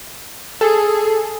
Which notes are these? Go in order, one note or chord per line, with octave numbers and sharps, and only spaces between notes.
G#4 A4